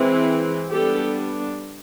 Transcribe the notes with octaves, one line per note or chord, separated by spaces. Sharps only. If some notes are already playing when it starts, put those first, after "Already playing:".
Already playing: E3 G#3 C4
G3 B3 D4 G4 A4